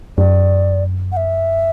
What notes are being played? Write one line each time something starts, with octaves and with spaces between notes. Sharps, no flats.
F#2 D5
F#5
E5